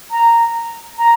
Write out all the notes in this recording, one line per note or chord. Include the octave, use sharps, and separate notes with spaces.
A#5
A#5